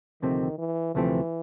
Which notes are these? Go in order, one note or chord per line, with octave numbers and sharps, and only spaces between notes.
D2 C3 D#3 F3 A3 C4
E3
D2 C3 E3 F3 A3 C4